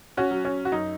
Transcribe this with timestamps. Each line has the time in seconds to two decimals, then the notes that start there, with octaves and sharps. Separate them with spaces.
0.17 C#4 F#4
0.31 F#3
0.45 C#4
0.65 F#4
0.72 F#2 D#4